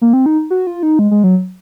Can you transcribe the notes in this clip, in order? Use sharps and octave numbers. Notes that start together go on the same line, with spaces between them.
A#3
C4
D#4
F#4
F4
D#4
G#3
G#3
F#3